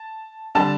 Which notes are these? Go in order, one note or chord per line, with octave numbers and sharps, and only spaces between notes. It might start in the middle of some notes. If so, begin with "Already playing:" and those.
Already playing: A5
D3 G3 D4 A5